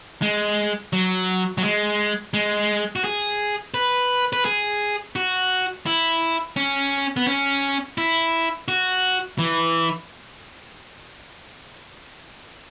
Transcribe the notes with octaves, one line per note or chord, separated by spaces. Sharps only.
G#3
F#3
F#3
G#3
G#3
F#4
G#4
B4
B4
G#4
F#4
E4
C#4
B3
C#4
E4
F#4
E3